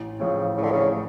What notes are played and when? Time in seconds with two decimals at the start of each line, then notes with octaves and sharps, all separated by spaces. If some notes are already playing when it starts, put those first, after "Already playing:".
Already playing: A1
0.20 A2 C#3 F3
0.57 A1 C#3
0.63 D3
0.71 C#3
0.93 A2